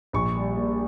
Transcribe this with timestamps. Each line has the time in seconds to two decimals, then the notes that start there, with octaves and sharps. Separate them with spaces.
0.13 A#1 C#6
0.36 G3
0.58 A#2